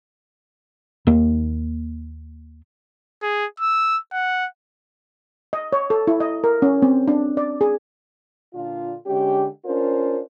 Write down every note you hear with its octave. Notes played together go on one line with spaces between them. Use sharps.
D#2 A#3
G#4
E6
F#5
D#5
C#5
A4
E4
D#5
A#4
C#4
C4
D4
D5
G#4
A#2 D3 D4 F4
D3 G#3 C#4 G4
C#4 D4 F4 A#4 C5